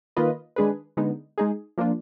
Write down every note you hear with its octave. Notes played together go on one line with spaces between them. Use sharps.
D#3 A#3 F4 B4 D#5
D#3 G#3 D4 G#4 B4
D3 G#3 B3 D#4
G#3 D#4 G#4
F3 A#3 D4 F4